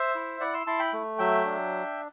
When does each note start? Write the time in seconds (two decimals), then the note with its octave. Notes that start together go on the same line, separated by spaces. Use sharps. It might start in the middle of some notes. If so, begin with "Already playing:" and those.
Already playing: C5 E5
0.15 E4
0.40 E4 D5 F#5
0.54 C6 E6
0.67 E4 A5 C6
0.79 G5 B5
0.93 A3
1.18 F#3 E5 G5
1.45 D4